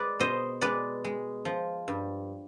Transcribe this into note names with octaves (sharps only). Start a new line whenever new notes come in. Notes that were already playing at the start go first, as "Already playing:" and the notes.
Already playing: G#3 G#4 B4 D5
B2 C5 D#5
G#3 B4 D5
G#3
F3
G2